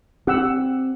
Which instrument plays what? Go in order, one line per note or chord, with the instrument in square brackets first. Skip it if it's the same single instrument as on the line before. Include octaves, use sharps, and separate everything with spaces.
[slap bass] C4 [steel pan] G4 F#5 E6